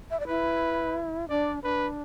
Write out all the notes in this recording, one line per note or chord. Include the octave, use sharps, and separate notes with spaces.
E5
D5
E4 B4
D4 D5
D4 B4